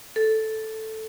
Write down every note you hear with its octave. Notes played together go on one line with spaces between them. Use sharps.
A4